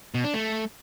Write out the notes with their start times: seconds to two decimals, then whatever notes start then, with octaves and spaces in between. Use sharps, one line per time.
0.14 B2
0.24 D4
0.34 A3